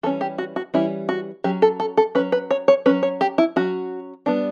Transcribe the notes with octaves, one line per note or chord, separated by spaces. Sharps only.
E3 G3 C#4 A4
G4
F#4
F#4
E3 G3 C#4 E4
F#4
F#3 C#4 G4
A4
A4
A4
F#3 C#4 B4
B4
C#5
C#5
F#3 C#4 B4
C#5
G4
E4
F#3 C#4 F#4
G3 B3 D4